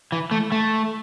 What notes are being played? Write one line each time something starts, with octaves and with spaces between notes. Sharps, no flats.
E3
A3
A3